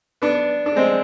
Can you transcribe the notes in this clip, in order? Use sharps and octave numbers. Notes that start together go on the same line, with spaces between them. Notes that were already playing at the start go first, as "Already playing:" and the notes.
B3 D4
D4
G#3 C4